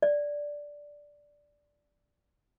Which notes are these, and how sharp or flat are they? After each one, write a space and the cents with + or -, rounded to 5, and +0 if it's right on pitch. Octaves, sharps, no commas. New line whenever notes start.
D5 -5